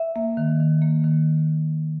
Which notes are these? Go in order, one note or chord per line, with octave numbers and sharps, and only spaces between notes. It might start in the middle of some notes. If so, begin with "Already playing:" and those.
Already playing: E5
A#3
D#3
D#3
A#3
D#3